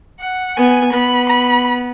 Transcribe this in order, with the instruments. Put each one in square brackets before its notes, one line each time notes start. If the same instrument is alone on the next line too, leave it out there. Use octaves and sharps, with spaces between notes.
[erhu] F#5
[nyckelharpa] B3 [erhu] G#5
[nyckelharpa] B3 [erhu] B5
[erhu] B5